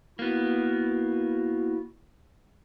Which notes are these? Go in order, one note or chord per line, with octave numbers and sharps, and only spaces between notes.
A#3 B3 E4 F#4